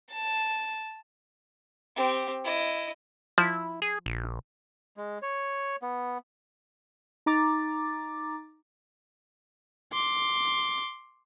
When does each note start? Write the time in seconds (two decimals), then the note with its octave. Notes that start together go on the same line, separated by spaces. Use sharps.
0.13 A5
1.96 C4 G4
2.44 E4 D#5
3.38 F3 E4
3.82 G#4
4.06 A#1
4.97 G#3
5.22 C#5
5.82 B3
7.26 D#4 A#5 D6 A6
9.92 C6 D6